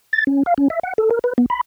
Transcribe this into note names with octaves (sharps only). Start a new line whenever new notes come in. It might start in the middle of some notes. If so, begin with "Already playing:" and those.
A6
C#4
F5
C#4
E5
F#5
A4
A#4
B4
B3
B5